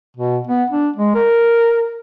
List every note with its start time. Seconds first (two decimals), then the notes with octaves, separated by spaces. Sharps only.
0.17 B2
0.47 B3
0.70 D4
0.96 G#3
1.15 A#4